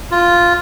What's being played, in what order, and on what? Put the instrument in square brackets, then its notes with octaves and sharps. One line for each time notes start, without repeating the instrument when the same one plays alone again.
[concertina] F4